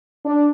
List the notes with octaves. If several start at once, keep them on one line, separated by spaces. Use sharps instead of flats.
D4